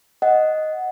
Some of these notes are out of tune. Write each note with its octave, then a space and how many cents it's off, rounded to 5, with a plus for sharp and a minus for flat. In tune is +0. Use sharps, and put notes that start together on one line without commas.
D#5 +0 F#5 +0